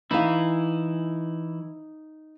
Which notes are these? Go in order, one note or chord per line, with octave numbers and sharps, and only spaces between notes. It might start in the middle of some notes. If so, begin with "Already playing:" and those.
E3 D#4 E4 F5